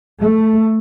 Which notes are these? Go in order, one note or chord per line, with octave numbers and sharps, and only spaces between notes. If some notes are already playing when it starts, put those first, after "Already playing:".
A3